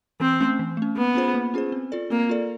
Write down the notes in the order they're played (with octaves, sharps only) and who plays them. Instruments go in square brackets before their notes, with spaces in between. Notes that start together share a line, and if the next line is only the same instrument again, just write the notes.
[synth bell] E3 [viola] C4
[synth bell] A3 C#4
E3
A3 C#4
[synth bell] A#3 [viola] B3
[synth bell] C#4 F4 G#4 C5
A#3
C#4 F4 G#4 C5
C4
F4 A4 D5
[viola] A#3 [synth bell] C4
[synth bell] F4 A4 D5